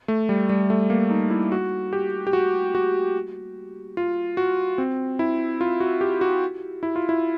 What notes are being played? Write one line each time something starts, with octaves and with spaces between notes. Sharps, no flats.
A3
G3
G3
A3
A#3
D#4
E4
F#4
G4
G4
F#4
F#4
F4
F#4
C4
E4
F4
F#4
G4
F#4
E4
F4
E4